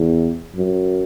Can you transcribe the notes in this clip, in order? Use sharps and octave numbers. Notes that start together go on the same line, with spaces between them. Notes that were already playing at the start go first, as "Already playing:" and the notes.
Already playing: E2
F#2